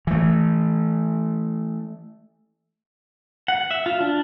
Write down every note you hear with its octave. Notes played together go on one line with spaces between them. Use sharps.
E3 A3
F#5
E5
F4
D4